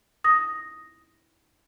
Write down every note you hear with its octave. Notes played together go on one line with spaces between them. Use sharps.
D#6 A#6